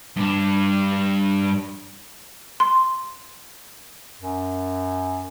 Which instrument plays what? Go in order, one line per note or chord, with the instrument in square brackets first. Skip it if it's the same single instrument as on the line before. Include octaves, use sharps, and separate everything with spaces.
[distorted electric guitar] G2 D4
[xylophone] C6
[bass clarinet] F#2